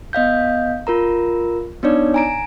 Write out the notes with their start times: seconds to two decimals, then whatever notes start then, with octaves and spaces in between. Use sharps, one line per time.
0.13 B3 D#5 F5 G6
0.87 F4 A#4 A#5
1.83 B3 D4 D#4 C#5 D5
2.14 G#5 A#5 D7